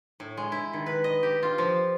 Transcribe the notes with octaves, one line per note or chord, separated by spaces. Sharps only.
A2
G#3
E4
D#3
B4
D#5
G4
F4
F3